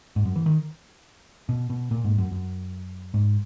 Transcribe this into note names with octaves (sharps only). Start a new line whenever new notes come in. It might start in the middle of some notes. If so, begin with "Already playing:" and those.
G#2
F#2
E3
D#3
B2
B2
A#2
G#2
F#2
F#2
G#2